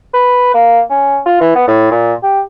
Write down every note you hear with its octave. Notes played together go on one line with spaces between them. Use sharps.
B4
A#3
C#4
F4
E3
B3
A2
A#2
G4